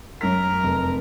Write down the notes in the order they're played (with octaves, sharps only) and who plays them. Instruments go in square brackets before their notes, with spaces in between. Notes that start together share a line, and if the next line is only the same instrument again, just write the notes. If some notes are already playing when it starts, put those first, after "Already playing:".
[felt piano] F#2 B6 [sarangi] A#4
[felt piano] F1